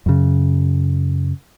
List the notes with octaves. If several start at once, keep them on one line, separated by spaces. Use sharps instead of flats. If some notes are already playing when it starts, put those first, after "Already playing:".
F#2 C#3